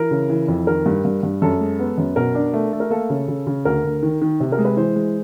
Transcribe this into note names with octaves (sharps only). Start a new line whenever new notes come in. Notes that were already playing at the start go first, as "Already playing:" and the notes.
Already playing: E3 A#4
C#3
E3
F2
D#3 A#4
G2
G2
G2
F#2 A4
G#3
B3
F#2
B2 A#4
D4
A3
A3
A#4
A#3 A4
C#3
C#3
C#3
D2 A#4
D2
D#3
D#3
C3
A#4
G#3
B4
E3 C5
G#3